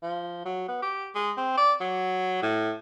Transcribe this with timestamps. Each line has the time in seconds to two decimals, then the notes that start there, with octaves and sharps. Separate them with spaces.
0.03 F3
0.45 F#3
0.68 B3
0.82 G4
1.15 G#3
1.37 C4
1.58 D5
1.81 F#3
2.42 A2